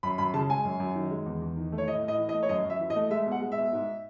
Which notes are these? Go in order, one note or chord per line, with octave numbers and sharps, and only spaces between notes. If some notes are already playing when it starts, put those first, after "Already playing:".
F#2 B5
F#2 B5
C#3 A5
G#3 G#5
F#2
F#2
D#3
G#3
E2
E2
D#3
A3
C#5
A2 D#5
A2
D#5
E3
D#5
A3
C#5
F#2 D#5
F#2
E5
E3
D#5
A3
G#3 E5
B2
F#5
G#3
E5
B2
G#2